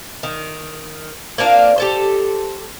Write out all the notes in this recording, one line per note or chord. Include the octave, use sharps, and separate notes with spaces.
D#3
A#3 C4 D4 F4
G4 A4 C5